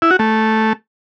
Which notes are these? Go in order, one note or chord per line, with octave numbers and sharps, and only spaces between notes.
E4
F#4
A3